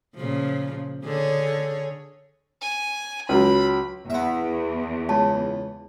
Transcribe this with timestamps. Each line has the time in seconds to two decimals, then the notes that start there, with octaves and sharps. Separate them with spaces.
0.16 A#2 C#3 F3
1.04 D3 G#4 C#5
2.62 G#5
3.29 C#2 F#3 B5
4.10 E2 B3 E5
5.09 C#2 A5